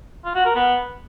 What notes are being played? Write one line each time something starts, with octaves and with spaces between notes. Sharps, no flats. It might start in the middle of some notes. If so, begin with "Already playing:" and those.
F4
F#4
A#4
B3